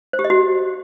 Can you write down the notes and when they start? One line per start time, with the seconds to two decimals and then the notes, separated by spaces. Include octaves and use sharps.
0.13 C5
0.19 G4
0.24 D#5
0.30 F#4